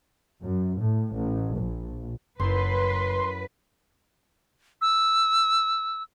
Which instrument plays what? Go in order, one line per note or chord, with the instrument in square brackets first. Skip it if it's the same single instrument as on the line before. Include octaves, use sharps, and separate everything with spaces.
[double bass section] F#2
A2
A1
A#1
[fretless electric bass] F#1 [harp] F#2 E4 [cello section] B4 [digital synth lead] C6
[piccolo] E6